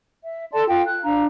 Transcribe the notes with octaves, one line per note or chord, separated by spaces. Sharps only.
E5
A4 D5 A5 C6
F4 F5 G5
F#6
D4 F5 A#5